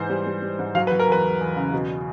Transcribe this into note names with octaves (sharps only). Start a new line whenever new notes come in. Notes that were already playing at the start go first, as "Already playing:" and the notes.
Already playing: G#2 E3 C5
G3
G3
G3
G#2
F#3 F5
B4
F#3
A#4
E2 B4
E2
E2
C#3
B2